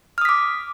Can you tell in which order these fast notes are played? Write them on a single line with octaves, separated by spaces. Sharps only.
F6 D#6 B6 D6